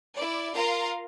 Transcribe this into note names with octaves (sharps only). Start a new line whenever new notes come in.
E4 D5
F4 A#4 F5 A#5 C6